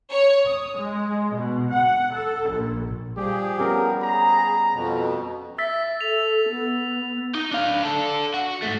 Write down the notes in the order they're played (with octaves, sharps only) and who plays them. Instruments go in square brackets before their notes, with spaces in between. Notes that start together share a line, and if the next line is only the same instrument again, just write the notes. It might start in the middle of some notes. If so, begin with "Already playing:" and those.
[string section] C#5
D#6
G#3
B2
F#5
A4
A#1
[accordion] F3 G#4 [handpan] G3 [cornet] G4
[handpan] B3 C#4 G4 [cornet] A#4
[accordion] G#4 [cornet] A#5
[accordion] F2 B2
[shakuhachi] E5 [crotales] E6 A6 B6
[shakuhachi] A4 [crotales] F7
[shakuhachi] B3
[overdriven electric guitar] D#4
D4 F5
D4 A4
F#4
G#2 A3